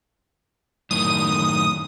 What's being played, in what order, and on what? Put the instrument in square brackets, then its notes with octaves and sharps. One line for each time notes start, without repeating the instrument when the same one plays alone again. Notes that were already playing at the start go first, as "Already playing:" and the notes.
[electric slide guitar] F#2 A2 D#3 [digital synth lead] D#6